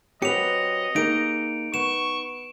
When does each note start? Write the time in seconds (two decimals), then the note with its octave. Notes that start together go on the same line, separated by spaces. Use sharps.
0.22 F#3 C4 G4 B4 D#5 C#7 F7
0.96 A#3 D#4 G4 G#4 D7
1.74 B3 C#6 E7